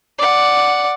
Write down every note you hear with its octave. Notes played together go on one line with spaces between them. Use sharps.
D5 F#5